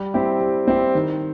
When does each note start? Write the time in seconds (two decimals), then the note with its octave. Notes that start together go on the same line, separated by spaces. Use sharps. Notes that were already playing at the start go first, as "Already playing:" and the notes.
Already playing: G3
0.14 C4 E4 G4
0.41 G3
0.68 C4 E4 G4
0.95 D#3